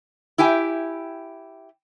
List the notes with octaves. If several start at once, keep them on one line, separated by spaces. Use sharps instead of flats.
E4 G4 G5 G#5